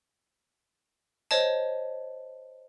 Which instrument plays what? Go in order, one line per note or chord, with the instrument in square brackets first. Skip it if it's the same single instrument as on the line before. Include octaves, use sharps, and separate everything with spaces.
[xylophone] C5 C#5 D#5 A5